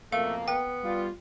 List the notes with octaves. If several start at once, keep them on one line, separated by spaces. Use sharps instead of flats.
F2 B2 A3 A#3 F5
B3 G5
G3 F4